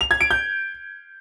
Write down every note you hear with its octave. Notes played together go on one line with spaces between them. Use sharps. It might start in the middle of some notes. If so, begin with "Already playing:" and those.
F7
G#6
D7
G6